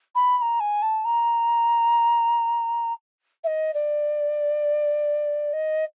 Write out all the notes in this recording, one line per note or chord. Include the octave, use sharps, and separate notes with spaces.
B5
B5
A#5
G#5
A5
A#5
E5
D#5
D5
D#5